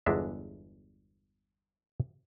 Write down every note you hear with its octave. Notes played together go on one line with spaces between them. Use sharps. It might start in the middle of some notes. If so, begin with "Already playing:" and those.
G1 E2 G#3 D4 E5